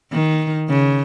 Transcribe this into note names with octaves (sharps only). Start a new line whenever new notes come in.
D#3
C#3